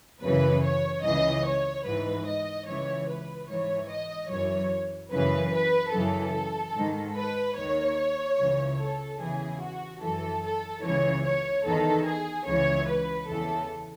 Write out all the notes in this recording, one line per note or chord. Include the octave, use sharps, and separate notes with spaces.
F#2 C#3 E3 B4
C#5
C#2 C#3 E3 D#5
C#5
G#2 E3 B4
D#5
C#2 C#3 E3 C#5
B4
G#2 E3 C#5
D#5
F#2 E3 C#5
F#2 C#3 E3 B4
B4
F#2 C#3 E3 A4
G#2 D#3
B4
D#2 D#3 C#5
C#2 C#3 E3
A4
E2 C#3 E3 G#4
F#4
F#2 E3 A4
A4
C#2 C#3 E3 C#5
C#5
E2 D#3 A4
G#4
C#2 C#3 E3 C#5
B4
E2 C#3 E3 A4